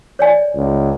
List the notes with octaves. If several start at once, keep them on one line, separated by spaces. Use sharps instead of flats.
C#5 D5 G#5
C#2